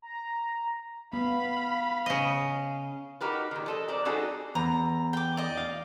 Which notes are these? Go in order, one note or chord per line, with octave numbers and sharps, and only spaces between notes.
A#5
B3 F5 B5
C#3 D#5
D#4 F#4 G4 A#4 B4
A#2 D#3
F3 A4 D#5
C4 A#4 D5
G3 C4 D#4 F#4 G#4 A4
E2 A#5
G5 D6
D5 D#5
F5